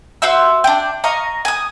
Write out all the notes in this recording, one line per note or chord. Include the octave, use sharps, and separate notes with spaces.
F#4 C5 E5 E6
D4 G5
D#5 F5 A#5 C#6
G#5 D#6